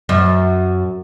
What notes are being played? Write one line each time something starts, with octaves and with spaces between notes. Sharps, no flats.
F#2